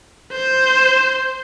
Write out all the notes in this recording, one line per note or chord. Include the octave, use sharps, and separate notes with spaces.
C5